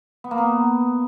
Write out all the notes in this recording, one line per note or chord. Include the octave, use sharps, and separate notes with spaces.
B3
A#3
B3